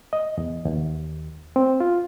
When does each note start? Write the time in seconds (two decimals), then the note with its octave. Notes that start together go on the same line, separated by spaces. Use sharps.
0.13 D#5
0.38 E2
0.65 D#2
1.56 C4
1.80 F4